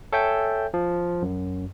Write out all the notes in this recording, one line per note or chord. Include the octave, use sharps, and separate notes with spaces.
A4 C#5 E5 G5 G#5 G6
F3
F#2